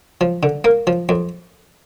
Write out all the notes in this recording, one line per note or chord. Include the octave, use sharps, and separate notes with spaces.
F3
D3
A#3
F3
F2